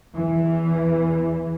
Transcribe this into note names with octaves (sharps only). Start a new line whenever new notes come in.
E2 E3